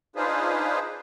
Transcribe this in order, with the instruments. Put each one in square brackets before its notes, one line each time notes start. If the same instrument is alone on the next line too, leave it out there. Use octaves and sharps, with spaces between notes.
[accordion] D4 D#4 F4 G#4 B4 C5